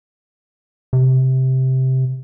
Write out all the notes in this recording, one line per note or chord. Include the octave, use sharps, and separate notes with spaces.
C3